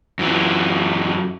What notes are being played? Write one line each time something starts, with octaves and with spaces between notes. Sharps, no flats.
F#2 E3